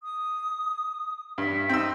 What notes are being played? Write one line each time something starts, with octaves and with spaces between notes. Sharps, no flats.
D#6
G2 E5
C4 D#4 E6